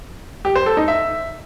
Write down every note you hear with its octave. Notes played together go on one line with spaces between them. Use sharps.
G4
C5
A4
D#4
E5